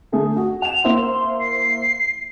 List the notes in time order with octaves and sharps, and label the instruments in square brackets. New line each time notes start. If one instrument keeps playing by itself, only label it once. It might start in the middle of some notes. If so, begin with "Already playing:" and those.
[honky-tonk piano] D3 A3 G#4
F#4
[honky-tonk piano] F#5 E7 [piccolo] F7
[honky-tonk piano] A#3 E4 C5 [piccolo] C6
[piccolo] C7